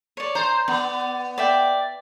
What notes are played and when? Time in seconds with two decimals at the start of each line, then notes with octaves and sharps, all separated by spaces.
0.17 C#5 D5
0.35 C5 A#5 C6
0.68 B3 D5
1.38 D5 E5 G5